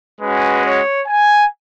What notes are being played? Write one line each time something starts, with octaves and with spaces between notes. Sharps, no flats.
G#3 C#4 F#4 B4
C#5
G#5